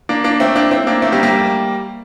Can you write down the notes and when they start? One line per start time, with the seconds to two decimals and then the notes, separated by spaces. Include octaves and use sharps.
0.09 A#3 D4
0.24 A#3 D4
0.40 A3 C4
0.55 A#3 D4
0.71 C4 E4
0.87 A#3 D4
1.02 A3 C4
1.12 G3 A#3
1.23 G3 A#3